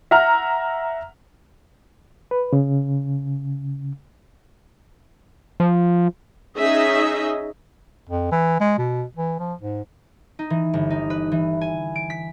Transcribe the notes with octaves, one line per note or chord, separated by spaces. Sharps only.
E5 F#5 A#5 F6
B4
C#3
F3
C#4 D#4 G#4 D#5 E5
F2
E3
G#3
B2
E3
F3
G#2
D#4
E3
G1
D#4
B4
E3
G#5
D7
B6